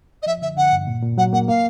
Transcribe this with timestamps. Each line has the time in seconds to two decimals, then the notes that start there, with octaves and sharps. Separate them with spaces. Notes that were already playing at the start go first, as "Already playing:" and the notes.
0.22 D#5
0.26 F3 E5
0.42 D3 E5
0.57 D3 F#5
0.72 G2
0.87 A#2
1.02 A#2
1.18 F#3 F#5
1.33 A#3 F#5
1.48 A#3 F5